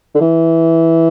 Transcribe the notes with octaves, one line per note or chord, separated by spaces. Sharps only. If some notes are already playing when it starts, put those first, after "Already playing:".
D3
E3